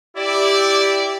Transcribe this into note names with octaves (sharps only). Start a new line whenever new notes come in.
E4 G4 D5